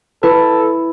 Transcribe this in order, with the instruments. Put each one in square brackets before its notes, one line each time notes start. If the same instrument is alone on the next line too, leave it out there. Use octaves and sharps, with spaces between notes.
[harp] E4 [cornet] A4 [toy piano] B4